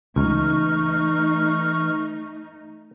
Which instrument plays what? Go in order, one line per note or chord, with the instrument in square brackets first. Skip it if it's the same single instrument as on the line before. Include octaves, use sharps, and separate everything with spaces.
[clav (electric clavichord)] C#2 [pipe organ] E3 C#6 F6 [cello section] A3 D#4